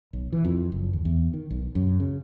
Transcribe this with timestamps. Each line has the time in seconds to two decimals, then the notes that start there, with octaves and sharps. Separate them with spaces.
0.13 B1
0.32 E3
0.44 F2
0.72 F#1
0.93 D#2
1.05 E2
1.33 D#3
1.50 B1
1.75 F#2
2.00 C#3